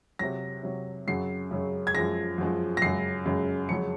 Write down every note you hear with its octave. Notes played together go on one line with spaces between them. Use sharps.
C3 F#3 A#6
C3 F#3
F#2 C#3 F#3 C7
F#2 C#3 F#3
G#6
F#2 F3 G#3 A#6
F#2 F3 G#3
A#6
F#2 C#3 G#3 C7
F#2 C#3 G#3
F2 C#3 F#3 C#7